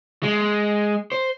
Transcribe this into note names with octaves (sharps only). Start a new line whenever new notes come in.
G#3
C5